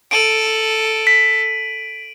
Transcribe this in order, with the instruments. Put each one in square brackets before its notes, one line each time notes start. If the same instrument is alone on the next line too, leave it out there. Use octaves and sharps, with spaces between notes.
[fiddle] A4 [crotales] D7 D#7 F#7
[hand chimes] B6